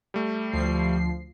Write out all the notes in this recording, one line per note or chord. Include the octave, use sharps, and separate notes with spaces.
G3 A3
D2 F3 C7